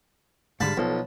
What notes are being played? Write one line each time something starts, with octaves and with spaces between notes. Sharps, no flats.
G#2 D3 G3 F5 A5 B5
B1 F3 A4